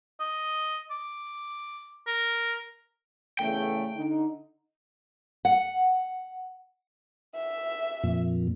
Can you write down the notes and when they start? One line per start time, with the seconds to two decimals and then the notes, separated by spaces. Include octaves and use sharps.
0.20 D#5
0.91 D6
2.07 A#4
3.39 E2 C#3 A3 G5
3.96 D3 D#4
5.45 F#5
7.35 E5
8.04 F2 A#2